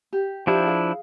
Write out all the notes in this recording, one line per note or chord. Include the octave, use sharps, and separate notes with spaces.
G4
F3 D4 E4 G4 C5 E5
G#4 F5